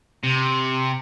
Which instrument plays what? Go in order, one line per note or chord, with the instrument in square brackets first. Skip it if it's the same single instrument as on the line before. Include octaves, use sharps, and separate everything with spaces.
[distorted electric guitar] C3